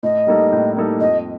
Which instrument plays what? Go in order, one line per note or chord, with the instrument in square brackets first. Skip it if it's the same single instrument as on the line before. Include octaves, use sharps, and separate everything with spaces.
[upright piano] A2 [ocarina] D#5
[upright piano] G3 A#3 D#4 A4
A2
G3 A#3 D#4 A4
[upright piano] F2 [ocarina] D#5